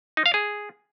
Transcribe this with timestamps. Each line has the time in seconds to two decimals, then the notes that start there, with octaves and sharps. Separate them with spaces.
0.17 D#4
0.26 F5
0.34 G#4